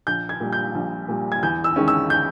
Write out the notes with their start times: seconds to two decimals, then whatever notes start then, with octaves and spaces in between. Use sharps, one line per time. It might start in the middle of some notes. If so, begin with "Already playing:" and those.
0.07 A#1 G6
0.29 G#6
0.40 A#2 G3
0.52 G6
0.75 A#1
1.08 A#2 G3
1.32 G#6
1.43 E2 G6
1.64 E6
1.76 D#3 G#3 C#4
1.88 E6
2.10 G6